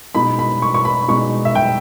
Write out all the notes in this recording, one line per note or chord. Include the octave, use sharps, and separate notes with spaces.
B2 G#3 D#4 B5
B5
C#6
C#6
B5
B2 G#3 D#4 C#6
E5
G5